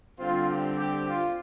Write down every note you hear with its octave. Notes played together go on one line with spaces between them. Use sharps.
D3 G3 C4 F4
G4
G4
F4